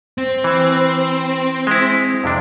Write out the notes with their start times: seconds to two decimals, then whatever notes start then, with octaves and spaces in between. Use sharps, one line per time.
0.18 C4
0.44 E3
1.67 G#3 E4
2.24 F2 C3 D4